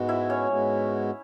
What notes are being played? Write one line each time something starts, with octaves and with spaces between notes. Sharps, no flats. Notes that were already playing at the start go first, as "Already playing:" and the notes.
Already playing: G#2 G#3 B3 F#4
E4 E5
C#4 C#5
G#2 G#3 B3 F#4